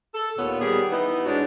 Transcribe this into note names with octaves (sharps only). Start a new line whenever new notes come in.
A4
D#2 A#2 B3 C#5
D#3 G3 B3 G#4
E3 B3 D#4 E4
G#2 D4 F#4 C#5